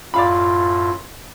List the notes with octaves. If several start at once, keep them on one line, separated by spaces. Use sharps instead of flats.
F#2 A2 F4 D5 F5 B5